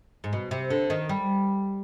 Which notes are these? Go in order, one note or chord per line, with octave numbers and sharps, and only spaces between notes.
G#2
B2
C3
D3
D#3
G3